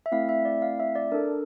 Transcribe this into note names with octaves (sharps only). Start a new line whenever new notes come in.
E5
A3 C4 E4 F5
E5
D5
F5
E5
D5
D4 A4 A#4